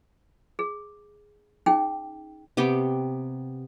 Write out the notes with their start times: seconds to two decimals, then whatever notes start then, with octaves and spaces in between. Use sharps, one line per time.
0.59 G#4
1.66 C#4 D#4 G#4 G5
2.57 C3 B3 G4 G5